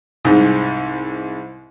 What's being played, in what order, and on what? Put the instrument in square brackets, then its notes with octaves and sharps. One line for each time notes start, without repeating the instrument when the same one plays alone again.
[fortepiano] C2 G#2